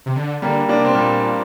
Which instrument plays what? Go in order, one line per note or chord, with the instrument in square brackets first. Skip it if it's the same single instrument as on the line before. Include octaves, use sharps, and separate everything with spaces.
[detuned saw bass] C3
D3
[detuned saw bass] D3 [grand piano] G3 A#3
[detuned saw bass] C3 [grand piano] A#3 D4
[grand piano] C4
[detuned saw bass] A#2 [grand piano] G3 A#3